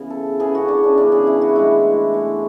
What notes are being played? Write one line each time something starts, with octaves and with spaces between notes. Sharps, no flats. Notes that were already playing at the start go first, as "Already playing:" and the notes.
Already playing: C#3 E3 B3
A4
C#3 E3 B3 G#4
F#4
D4
C#4
C#3 E3 B3 D4
G#4
E4
F#4
A2 E3 G#3 E4
A2 E3 G#3